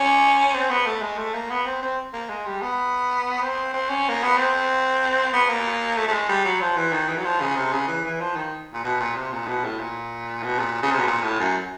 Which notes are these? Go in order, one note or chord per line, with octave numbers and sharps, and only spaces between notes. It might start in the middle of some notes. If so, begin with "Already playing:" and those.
Already playing: C#4
C4
B3
A3
G#3
A3
A#3
B3
C4
C4
A#3
G#3
G3
B3
C4
C4
C#4
A#3
B3
C4
B3
A#3
A3
A3
G#3
G3
F#3
F3
E3
D#3
E3
F#3
F3
C#3
C3
C#3
E3
E3
F3
D#3
A#2
B2
A#2
C3
A#2
B2
A2
A#2
B2
A#2
C#3
C3
B2
A#2
A2
F#2